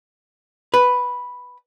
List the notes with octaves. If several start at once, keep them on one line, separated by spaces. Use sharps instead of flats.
B4